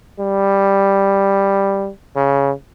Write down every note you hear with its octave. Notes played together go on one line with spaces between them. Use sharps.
G3
C#3